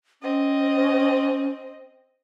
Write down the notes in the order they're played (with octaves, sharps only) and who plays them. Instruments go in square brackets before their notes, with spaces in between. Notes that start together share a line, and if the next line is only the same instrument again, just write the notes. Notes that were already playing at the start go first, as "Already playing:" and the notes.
[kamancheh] C4 D#5 [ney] C#4